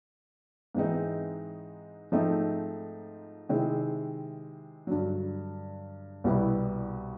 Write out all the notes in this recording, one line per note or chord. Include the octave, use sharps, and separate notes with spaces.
G#2 E3 G#3 C4 D#4
G#2 F3 A3 C4 D#4
C3 D#3 G#3 C4 E4
G2 D3 F#3
C2 B2 G3 B3 E4